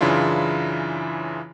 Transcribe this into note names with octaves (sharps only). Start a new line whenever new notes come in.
F#2 C#3 E3 D4 E4 F4